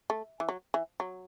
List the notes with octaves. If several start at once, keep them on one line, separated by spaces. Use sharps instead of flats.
A3
E3
F#3
E3
F#3